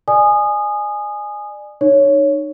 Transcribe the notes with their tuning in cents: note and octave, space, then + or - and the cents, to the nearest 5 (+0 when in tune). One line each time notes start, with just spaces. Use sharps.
D5 +30 G#5 +0 D#6 -20
D#4 -30 C#5 +5